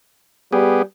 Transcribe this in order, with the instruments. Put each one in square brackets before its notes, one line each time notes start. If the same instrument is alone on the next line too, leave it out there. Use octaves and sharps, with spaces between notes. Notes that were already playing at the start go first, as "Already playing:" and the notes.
[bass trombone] G3 [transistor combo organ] B3 G4 G#4